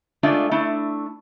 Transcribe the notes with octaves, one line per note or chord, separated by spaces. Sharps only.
G#3 A3 D4 F4 D5 E5
A3 D4 E4